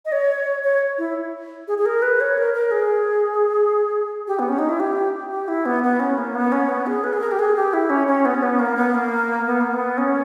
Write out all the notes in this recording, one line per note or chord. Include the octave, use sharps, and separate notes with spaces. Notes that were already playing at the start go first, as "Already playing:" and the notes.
D#5
C#5
C#5
E4
G#4
G#4
A#4
B4
C#5
A#4
A#4
G#4
G4
B3
C#4
D#4
E4
G4
G4
E4
B3
B3
C#4
A#3
B3
C#4
B3
G#4
B4
G#4
A#4
G4
G#4
G4
E4
C#4
C#4
B3
C#4
B3
A#3
B3
A#3
B3
A#3
B3
C#4